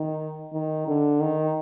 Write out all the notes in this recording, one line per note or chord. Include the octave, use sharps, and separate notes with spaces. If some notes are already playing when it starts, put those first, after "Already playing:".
Already playing: D#3
D#3
D3
D#3